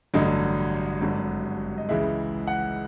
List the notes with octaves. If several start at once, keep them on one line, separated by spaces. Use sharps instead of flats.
A1 G2 D3 F#3 D#5
G#1 G2 D3 F#3
D#5
C#2 C#3 E3 G#3 E5
F#5